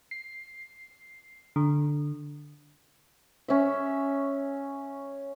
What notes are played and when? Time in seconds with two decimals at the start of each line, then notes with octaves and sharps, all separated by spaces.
0.11 C7
1.56 D3
3.48 C#4 E5